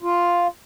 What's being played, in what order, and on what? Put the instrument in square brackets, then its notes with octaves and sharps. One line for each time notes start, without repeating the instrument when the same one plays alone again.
[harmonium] F4